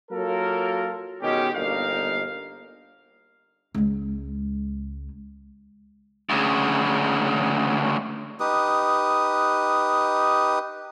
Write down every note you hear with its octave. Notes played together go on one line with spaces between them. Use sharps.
F#3 A#3 F4 A4 A#4
B2 D#3 G#3 C#4 G4
G1 A#2 A#3 D#4 F5
C#2 G#3
D2 C#3
D#4 G4 B4 D#6